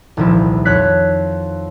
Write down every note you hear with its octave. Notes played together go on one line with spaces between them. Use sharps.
D#1 C2 F3 E4
F2 C#5 F#6 B6